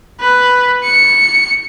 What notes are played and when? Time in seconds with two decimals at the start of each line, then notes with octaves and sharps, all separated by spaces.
0.20 B4
0.84 C#7